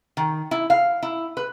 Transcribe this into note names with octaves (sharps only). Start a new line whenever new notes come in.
D#3
E4
F5
E4
B4